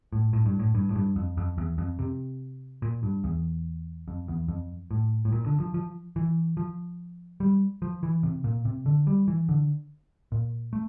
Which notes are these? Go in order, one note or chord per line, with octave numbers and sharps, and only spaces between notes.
A2
A2
G2
A2
G2
A2
G2
F2
F2
E2
F2
C3
A#2
G2
E2
F2
E2
F2
A2
A2
A#2
D3
F3
F3
E3
F3
G3
F3
E3
C3
A#2
C3
D3
G3
E3
D3
A#2
A3